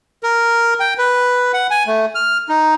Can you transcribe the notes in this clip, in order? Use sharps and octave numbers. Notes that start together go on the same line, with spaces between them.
A#4
G5
B4
F#5
G#5
A3
F6
D#4